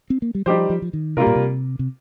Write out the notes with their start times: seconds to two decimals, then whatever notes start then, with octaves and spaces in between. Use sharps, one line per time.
0.10 C4
0.22 A#3
0.35 G3
0.46 F3 G3 D#4 G4 C5
0.70 F3
0.82 F3
0.93 D#3
1.17 C3 G3 A#3 F4 A#4
1.27 A#2
1.36 C3
1.79 C3